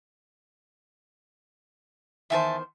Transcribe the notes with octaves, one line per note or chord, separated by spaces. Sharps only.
E2 D#3 C5 E5 G#5 A5